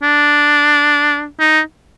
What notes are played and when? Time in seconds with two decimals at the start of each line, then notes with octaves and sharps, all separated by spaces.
0.03 D4
1.40 D#4